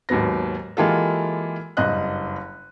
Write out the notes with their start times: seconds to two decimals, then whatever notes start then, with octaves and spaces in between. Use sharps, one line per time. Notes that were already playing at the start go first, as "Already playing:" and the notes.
0.09 D#2 G#2 F#3 B3 A#6
0.77 E3 G#3 A#3 F4 G4 A4
1.77 F#1 G2 D#5 F#6